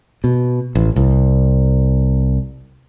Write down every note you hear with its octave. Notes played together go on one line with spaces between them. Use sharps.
B2
A1
C2